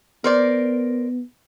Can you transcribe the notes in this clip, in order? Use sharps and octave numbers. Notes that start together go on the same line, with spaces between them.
B3 A#4 C5 D5